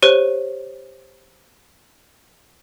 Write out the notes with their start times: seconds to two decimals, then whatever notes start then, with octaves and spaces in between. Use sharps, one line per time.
0.02 G4 C5 C#5